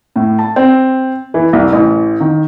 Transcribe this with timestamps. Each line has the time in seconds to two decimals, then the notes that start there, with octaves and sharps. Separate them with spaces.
0.16 A2
0.39 A5
0.56 C4
1.34 E3
1.53 C2
1.72 A1
2.20 D#3